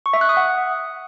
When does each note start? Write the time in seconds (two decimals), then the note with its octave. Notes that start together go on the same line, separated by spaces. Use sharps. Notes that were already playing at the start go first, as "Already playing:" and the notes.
0.06 C#6
0.13 E5
0.21 F#6
0.29 D#6
0.37 F#5